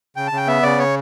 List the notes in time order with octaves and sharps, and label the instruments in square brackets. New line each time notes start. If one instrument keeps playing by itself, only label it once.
[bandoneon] C#3 G5
A5
C#3 G5
B3 E5
C#3 D5
C#5